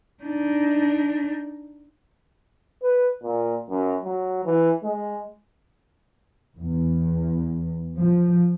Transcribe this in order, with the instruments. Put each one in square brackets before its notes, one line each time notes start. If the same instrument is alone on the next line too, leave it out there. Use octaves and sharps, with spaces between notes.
[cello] D4 D#4
[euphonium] B4
A#2
F#2
F#3
E3
G#3
[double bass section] E2
F3